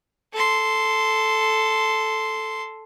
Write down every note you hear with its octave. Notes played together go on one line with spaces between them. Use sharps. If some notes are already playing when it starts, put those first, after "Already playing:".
A4 C6